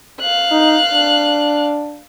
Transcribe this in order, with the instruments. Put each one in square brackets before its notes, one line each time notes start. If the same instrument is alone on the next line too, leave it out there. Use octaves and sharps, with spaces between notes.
[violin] F5 F#6
[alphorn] D#4
D4